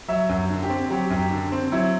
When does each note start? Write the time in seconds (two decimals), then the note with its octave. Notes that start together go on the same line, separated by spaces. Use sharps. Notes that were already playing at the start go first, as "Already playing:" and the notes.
0.08 F#3 E5
0.29 F#2
0.49 D3
0.63 G4
0.70 C4
0.90 F#3 G4
1.10 F#2
1.18 G4
1.31 D3
1.52 C4
1.72 F#3 E4